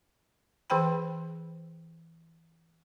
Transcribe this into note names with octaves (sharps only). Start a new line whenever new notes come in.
E3 G#4 C5 G5 B5